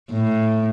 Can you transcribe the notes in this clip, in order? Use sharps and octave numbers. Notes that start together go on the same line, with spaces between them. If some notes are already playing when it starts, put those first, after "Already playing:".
A2